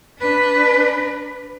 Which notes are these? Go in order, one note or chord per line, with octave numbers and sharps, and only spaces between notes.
D4 B4